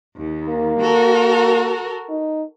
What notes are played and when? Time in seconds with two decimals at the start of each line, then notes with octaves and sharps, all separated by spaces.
0.16 D#2
0.47 A#3
0.79 F#4 A4 A#4
2.09 D#4